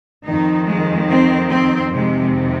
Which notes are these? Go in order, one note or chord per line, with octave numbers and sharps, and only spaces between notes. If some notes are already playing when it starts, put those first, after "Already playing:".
F2 D#3 D#4
G#3
C4
C4
F2 C3 D#3 G#3